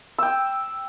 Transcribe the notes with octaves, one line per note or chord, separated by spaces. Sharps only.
G5 E6